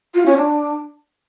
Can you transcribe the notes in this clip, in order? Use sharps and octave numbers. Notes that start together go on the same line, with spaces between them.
F4
C#4
D4